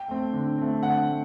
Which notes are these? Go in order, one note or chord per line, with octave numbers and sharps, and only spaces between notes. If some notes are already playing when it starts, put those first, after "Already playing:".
Already playing: G5
A3 C4
D3
A3 C4
D3 F#5
A3